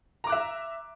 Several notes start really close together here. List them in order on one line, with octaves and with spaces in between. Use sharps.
A#5 D6 F#6 E5